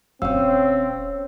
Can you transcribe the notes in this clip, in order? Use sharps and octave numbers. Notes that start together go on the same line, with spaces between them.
D#1 C4 C#4 C#5 F5 E6